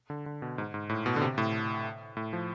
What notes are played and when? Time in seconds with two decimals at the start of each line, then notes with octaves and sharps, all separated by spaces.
0.10 D3
0.26 D3
0.42 B2
0.58 G#2
0.74 G#2
0.89 A2
1.06 B2
1.16 D3
1.22 C3
1.38 A2
2.17 A2
2.33 F3